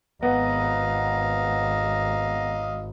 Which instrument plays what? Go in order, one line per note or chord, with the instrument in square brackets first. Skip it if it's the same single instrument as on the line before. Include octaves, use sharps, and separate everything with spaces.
[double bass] G#1 [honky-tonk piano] B3 [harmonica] D#5 F5 [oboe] A#5